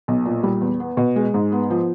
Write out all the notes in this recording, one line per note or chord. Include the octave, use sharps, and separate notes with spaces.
B1
A#2
G3
E2
B3
B2
G#3
G#2
B3
F3